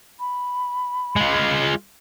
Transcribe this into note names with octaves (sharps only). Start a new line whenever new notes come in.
B5
G#3 F4